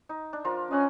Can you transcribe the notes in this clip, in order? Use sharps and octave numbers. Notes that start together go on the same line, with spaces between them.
D#4
D4
F3 F4 A#4
C#4 D#5 F#5 G#5